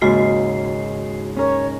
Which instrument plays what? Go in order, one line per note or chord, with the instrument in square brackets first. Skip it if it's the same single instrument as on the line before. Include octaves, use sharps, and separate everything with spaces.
[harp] D#2 G#2 C#3 [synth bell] F#4 C7
[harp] C#4 A#4 [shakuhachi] C#5